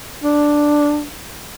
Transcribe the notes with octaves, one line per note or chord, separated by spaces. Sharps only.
D4